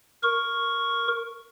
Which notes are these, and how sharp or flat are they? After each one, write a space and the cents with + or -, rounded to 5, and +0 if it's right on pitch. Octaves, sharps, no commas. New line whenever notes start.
A#4 +0 C#6 +0